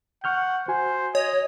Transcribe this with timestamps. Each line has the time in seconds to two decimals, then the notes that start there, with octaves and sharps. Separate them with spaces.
0.24 F#5 C#6 F6 G6
0.68 F#4 C5 G#5
1.15 C#5 D#5